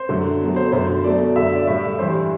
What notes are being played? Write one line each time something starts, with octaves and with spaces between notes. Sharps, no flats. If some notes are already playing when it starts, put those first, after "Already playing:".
Already playing: C5
F#2 D3 F#3 A3
B2 F#3 A3
C5
F#2 D3 A3 C5
B2 F#3 A3 D5
F#2 D3 A3 E5
D5
A2 G3 E5
G2 E3 G3 C5